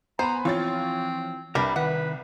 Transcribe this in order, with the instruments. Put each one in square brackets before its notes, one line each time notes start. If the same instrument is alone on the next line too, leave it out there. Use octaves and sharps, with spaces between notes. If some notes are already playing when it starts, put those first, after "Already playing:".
[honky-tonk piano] B3 G#5 B5 [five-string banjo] C5 [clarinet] A#5
[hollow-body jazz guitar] E3 F3 [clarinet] C4 [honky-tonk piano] F4 C#5 A6
[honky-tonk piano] C2 [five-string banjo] G3 D4 B5 [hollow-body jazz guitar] A#4 B4 E5
[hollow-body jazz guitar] D#3 [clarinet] B4 [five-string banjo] F#5